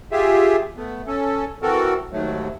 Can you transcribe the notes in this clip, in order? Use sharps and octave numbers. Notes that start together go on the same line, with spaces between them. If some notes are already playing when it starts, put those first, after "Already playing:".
F4 G4 G#4 E5
A3 B3
C#4 A4
E3 C4 F#4 A4 A#4
D#2 G#2 F#3 A3